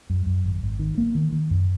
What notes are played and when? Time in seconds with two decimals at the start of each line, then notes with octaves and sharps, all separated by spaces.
0.10 F#2
0.26 F#2
0.44 G#1
0.62 G#1
0.79 D#3
0.98 A#3
1.15 D#3
1.32 D#3
1.51 F#2